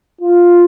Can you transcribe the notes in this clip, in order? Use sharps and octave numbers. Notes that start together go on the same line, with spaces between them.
F4